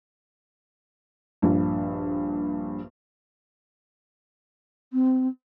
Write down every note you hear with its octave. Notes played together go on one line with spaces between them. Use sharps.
A#1 G2
C4